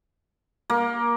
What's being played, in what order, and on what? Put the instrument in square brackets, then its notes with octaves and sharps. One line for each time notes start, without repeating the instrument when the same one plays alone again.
[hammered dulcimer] A#3